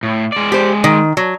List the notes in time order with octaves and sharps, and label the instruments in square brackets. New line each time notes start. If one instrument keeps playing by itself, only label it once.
[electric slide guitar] A2
G#3 D5
[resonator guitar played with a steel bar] G4 C5
D#3
F#3